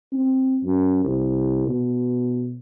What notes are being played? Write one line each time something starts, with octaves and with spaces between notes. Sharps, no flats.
C4
F#2
C2
B2